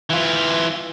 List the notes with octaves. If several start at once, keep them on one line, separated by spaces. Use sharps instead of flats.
E3 F4